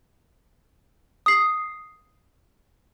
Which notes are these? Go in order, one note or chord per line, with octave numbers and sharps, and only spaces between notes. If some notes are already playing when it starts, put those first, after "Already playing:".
D#6 C7